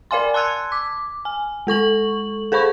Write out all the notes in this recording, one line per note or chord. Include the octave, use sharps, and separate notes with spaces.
A#4 D5 F5 G#5 C6
A5 C6 E6 F#6 G#6
D6
G#5
G#3 A4 C#6 F#7
G#4 A4 C5 B5 C#6